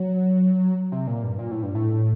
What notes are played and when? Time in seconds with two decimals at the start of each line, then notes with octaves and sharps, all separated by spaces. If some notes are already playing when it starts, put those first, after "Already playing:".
Already playing: F#3
0.92 C3
1.07 A#2
1.23 G2
1.39 A#2
1.51 A2
1.63 G2
1.75 A2